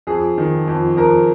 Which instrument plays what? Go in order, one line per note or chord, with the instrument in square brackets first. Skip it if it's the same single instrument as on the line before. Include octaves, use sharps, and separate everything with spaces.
[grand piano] F2 G#4
D#3
F2
F2 A#4